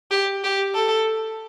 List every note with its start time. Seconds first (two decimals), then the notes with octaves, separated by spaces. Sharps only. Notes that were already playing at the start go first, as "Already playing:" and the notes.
0.11 G4
0.44 G4
0.74 A4